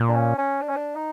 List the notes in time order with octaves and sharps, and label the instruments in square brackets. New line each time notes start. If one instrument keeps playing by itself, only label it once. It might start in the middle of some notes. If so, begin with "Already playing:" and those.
Already playing: [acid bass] A#2
[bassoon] D4
C#4
C#4
D4
C#4
D4
D#4